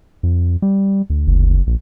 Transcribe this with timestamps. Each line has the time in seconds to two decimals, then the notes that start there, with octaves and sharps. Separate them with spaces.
0.23 F2
0.62 G3
1.10 D2
1.26 F#1
1.67 A#1